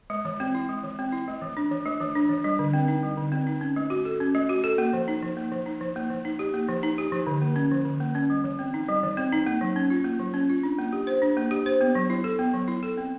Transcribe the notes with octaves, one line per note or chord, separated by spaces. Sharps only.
G#3
E3
C4
E4
G#3
E3
C4
E4
A3
E3
D4
E3
A3
E3
D4
E3
G3
D3
C4
D#4
G3
D3
C4
D#4
C#4
A3
F#4
A4
C#4
A3
F#4
A4
A#3
F3
D#4
F3
A#3
F3
D#4
F3
A#3
F3
D#4
G4
A#3
F3
D#4
G4
F3
D3
A#3
C#4
F3
D3
A#3
C#4
G3
E3
C4
D#4
G3
E3
C4
D#4
A#3
F#3
C#4
F4
A#3
F#3
C#4
F4
D4
A#3
G4
C5
D4
A#3
G4
C5
B3
F#3
E4
A4
B3
F#3
E4
A4
C4